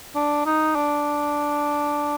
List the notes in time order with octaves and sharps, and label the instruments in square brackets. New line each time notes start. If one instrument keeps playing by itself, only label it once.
[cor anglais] D4
D#4
D4